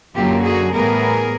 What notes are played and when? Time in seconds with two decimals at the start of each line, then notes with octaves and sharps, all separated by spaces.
0.15 F#2 D3 F#3 A#3 F4 G4
0.43 F#4 G#4
0.72 A2 E3 G3 B3 G#4 A#4